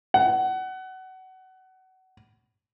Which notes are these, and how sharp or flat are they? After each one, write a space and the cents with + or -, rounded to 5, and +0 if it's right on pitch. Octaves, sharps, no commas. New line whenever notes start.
F#5 +25